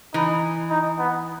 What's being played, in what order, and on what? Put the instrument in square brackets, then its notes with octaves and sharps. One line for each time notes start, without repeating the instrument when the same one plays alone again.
[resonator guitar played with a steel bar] E3 [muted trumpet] D#4
[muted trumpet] D#4
B3